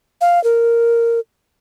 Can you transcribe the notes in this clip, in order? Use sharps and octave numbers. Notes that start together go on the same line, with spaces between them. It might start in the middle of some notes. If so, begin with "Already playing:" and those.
F5
A#4